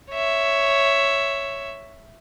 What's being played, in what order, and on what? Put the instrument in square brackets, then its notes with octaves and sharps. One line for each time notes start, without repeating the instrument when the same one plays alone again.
[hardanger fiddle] C#5 E5